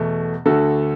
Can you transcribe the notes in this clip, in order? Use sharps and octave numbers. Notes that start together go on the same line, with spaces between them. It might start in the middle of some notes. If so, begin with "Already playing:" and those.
Already playing: E2 B2 A3
D2 D3 A3 F#4 A4